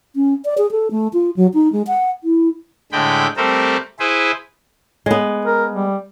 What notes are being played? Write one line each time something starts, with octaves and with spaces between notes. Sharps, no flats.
C#4
D5
G#4
A4
A3
F4
F#3
D#4
G#3
F#5
E4
A2 D3 G#3 G5 B5
G3 A3 C4 A4 A#4 C5
E4 G#4 B4 C5
G#3 B3
A#4
G3